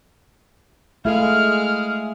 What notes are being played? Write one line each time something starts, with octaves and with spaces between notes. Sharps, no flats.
G#3 A3 E4 G#4 A4 F5 F6